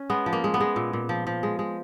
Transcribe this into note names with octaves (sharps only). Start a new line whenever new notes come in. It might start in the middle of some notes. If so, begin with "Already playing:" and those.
Already playing: C#4
G#3 B3
F3
A#3
G#3
B3
G#3
A#2
A#2
F3
F3
G#3
G#3